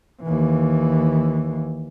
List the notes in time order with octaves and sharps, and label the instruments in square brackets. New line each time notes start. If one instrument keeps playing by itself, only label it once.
[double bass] D#2 E3